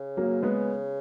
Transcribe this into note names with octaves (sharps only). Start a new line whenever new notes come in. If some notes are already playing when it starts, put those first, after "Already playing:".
Already playing: C#3
F#3 A#3
G#3 B3